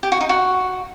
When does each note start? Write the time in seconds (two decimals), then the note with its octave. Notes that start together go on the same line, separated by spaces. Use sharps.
0.03 G4
0.12 F#4
0.21 D#4
0.29 F#4